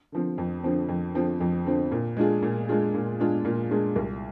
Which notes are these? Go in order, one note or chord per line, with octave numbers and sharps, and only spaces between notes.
D3 F3 C4
F2
D3 F3 C4
F2
D3 F3 C4
F2
D3 F3 C4
A#2
G#3 D4 F4 G#4
A#2
G#3 D4 F4 G#4
A#2
G#3 D4 F4 G#4
A#2
G#3 D4 F4 G#4
C2